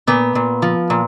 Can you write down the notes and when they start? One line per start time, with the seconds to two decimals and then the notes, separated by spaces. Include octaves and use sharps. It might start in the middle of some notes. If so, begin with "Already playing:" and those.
0.07 A#2 B3
0.35 A#2
0.62 F3
0.90 A#2